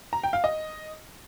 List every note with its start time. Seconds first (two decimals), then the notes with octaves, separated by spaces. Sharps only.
0.13 A#5
0.24 G5
0.33 F5
0.44 D#5